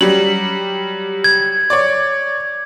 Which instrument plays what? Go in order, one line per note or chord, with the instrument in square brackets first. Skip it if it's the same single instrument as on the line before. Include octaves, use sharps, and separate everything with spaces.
[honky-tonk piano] F#3 G3 [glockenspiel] F#7
[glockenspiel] G#6
[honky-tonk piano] C#5 D5